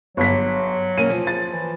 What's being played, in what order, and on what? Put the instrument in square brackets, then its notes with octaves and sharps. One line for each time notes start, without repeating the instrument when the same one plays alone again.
[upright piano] G1 B6 [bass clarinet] F#3
[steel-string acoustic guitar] A#3 C#4 [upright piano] D#7
[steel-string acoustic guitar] F3
[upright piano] A6
[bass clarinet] E3